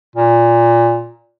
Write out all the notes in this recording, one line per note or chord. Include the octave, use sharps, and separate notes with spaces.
A#2